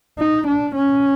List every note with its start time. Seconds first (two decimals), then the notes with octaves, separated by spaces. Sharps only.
0.18 D#4
0.47 D4
0.75 C#4